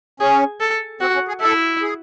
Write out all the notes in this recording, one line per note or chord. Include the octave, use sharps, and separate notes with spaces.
C#4 G#4
A4
C4 F#4
C#4
G#4
E4 A4
G#4